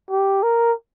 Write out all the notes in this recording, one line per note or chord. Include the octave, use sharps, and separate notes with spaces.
G4
A#4